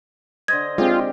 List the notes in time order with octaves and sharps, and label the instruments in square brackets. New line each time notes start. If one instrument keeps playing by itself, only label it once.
[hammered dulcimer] D3 C5 D#5 [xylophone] G#6
[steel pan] G#3 C4 [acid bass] F4 [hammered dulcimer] G4 G#4 G5